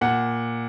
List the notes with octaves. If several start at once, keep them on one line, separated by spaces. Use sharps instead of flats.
A#2 F#5